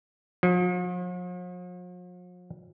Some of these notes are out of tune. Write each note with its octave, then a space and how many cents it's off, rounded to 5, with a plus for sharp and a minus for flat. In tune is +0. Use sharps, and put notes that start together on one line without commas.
F3 +45